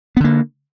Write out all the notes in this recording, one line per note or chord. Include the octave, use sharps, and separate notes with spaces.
D3 A#3 B3